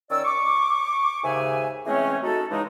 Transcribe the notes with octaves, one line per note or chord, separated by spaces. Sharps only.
D#3 C#4 A#4 D5 E6
C#6 D6
D#2 G#2 C#3 E5 G#5
E3 G#3 A3 C4 C#4
D#4 F#4 A4
C#3 E3 G#3 D#4